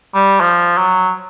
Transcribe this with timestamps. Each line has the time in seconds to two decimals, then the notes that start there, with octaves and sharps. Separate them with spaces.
0.15 G3
0.41 F3
0.78 F#3